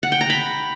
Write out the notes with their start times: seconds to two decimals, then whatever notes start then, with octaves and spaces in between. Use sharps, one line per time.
0.03 F#5
0.12 G5
0.21 A#5
0.30 B5